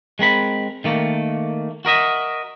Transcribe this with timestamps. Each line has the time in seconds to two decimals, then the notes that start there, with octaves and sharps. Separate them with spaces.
0.19 G#3 C4 A#4 B5
0.84 D#3 A3 A#3
1.85 F#4 A#4 D#5 E5